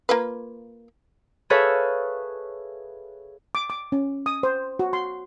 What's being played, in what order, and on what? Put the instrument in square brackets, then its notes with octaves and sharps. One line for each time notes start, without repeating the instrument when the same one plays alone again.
[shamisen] A#3 F4 B4
[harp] G#4 A4 B4 C#5 E5 F5
[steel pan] D6
D6
C#4
D#6
C5
F#4
C6